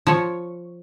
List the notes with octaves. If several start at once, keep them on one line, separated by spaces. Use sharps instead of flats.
F3 C#5